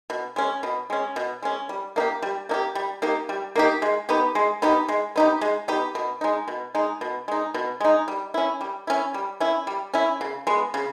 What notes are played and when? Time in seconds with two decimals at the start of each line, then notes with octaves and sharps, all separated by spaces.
0.10 B2
0.36 G#3 C#4
0.63 B2
0.90 G#3 C#4
1.16 B2
1.42 G#3 C#4
1.69 G3
1.96 A#3 D#4 G4
2.22 G3
2.49 A#3 D#4
2.54 G4
2.75 G3
3.02 A#3 D#4 G4
3.29 G3
3.56 A#3 D#4 G4
3.82 G#3
4.09 B3 D#4 G4
4.35 G#3
4.62 B3 D#4 G4
4.89 G#3
5.16 B3 D#4 G4
5.41 G#3
5.68 B3 D#4 G4
5.95 B2
6.21 G#3 D#4
6.48 B2
6.75 G#3 D#4
7.01 B2
7.28 G#3 D#4
7.54 B2
7.80 G#3 D#4
8.08 G3
8.34 C#4 E4
8.61 G3
8.87 C#4 E4
9.14 G3
9.40 C#4 E4
9.67 G3
9.94 C#4 E4
10.21 C#3
10.47 G#3 B3
10.74 C#3